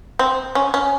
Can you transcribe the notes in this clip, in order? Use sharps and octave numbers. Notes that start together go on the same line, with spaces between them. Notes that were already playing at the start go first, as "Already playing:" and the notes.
C4
C#4
C#4